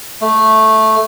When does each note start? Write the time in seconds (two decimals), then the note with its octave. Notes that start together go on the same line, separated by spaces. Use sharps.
0.21 A3